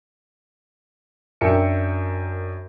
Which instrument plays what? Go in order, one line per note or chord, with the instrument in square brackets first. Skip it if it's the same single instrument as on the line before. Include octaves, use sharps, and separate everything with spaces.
[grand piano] F#2 D4 A#4 E5 G5 C#7